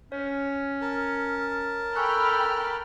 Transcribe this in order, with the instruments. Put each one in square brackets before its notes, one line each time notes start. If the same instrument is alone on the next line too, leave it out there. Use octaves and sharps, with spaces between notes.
[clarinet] C#4 [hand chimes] C#5
[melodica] A#4 A5
[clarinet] A4 [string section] G5 B5 F6 [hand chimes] G#5 C#6 F#6